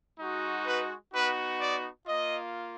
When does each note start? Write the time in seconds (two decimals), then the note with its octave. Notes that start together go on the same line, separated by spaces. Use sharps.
0.19 G#3 D#4 F#4
0.66 B4
1.13 B3 D#4 F#4 B4
1.60 D5
2.07 A#3 F4 D#5